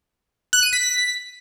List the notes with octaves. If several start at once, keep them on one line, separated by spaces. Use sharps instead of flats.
F#6
D#7
B6